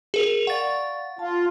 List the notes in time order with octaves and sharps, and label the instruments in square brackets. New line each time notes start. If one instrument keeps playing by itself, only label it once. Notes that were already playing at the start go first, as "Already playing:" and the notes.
[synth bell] G#4 A#4 F7
[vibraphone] D5 F5 C#6 [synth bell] F#5 A6
[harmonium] F4 [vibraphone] A5